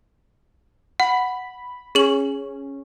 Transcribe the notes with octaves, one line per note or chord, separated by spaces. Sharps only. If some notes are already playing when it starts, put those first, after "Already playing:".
F#5 B5
C#4 G#4 F#7